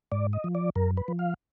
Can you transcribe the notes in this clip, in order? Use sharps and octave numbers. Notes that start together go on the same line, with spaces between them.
G#2 D5
D#5
F3
D5
F#2 A#4
B4
F3
F5